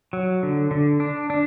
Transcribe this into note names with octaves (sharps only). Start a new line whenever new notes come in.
F#3
D3
D3
D4
D4